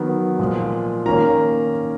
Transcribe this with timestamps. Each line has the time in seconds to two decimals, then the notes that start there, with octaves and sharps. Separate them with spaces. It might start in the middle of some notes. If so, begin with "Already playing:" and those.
Already playing: D#3 F#3 B3
0.39 A#2 F3 G#3
1.06 D#3 A#3 C#4 A#5